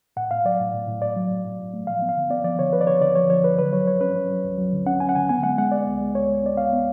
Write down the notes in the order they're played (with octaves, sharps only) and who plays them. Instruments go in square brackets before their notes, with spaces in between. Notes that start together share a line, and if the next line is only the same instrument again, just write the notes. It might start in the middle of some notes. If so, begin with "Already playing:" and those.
[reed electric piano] A2 F#5
A2 F5
F#3 D5
A2
A2
A2
A2 D5
F#3
A2
A2
A2
A3
F3 F5
B3
F5
D3
B3 D5
F3 D5
D3 C#5
F3 B4
D5
D3 C#5
D3 D5
F3 C#5
F3 C#5
F3 B4
F#3 B4
F#3 C#5
F#3 C#5
C#4 B4
F#3
F#3
D2
F#3
D3
C#4 F#5
C#4 G#5
F#5
D3 G#5
B3 G#5
G#3 F#5
G#3 F#5
B3 D5
C#2
G#3
C#2 C#5
G#3
B3 D5
B3 F5
B3